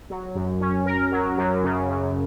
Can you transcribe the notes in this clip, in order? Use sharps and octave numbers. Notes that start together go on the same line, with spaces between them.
F#3
F#2
C#4
A#4
F#3
F#2
C#3
F#2